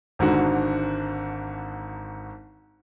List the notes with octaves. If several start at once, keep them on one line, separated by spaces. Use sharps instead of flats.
G#1 G#2 D3 F#4